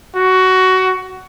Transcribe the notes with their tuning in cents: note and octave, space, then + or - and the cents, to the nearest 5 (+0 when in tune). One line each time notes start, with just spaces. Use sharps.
F#4 +15